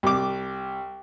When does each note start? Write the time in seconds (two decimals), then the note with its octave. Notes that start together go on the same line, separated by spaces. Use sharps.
0.03 C2 D6